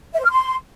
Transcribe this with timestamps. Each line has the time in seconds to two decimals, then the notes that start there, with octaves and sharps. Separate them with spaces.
0.14 E5
0.19 C5
0.25 F6
0.30 C6